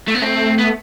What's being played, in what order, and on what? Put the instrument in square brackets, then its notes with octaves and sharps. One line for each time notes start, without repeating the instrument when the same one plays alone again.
[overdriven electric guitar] A3
B3
[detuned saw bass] A3 [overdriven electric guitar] C4
[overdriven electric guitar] B3